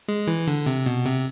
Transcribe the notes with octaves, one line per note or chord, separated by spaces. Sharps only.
G#3
E3
D3
C3
B2
C3